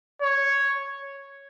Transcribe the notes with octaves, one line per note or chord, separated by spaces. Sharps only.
C#5